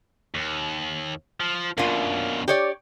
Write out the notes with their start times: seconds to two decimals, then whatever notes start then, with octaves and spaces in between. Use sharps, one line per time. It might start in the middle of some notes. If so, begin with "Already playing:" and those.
0.35 D#2
1.40 F3
1.78 F#2 B2 A#3 D4 F4
2.48 G4 C#5 D5